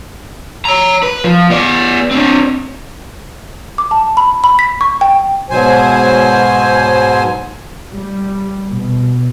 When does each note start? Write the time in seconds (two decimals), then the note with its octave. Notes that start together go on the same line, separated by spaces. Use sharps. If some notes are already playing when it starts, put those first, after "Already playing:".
0.65 C#5 A#5
1.03 B4
1.24 F3
1.50 B3 D5
2.11 C4 D4
3.78 D6
3.91 A5
4.17 B5
4.44 B5
4.59 B6
4.81 C#6
5.01 G5
5.50 G#2 B2 F#3 C5 G#5
7.93 G3
8.71 B2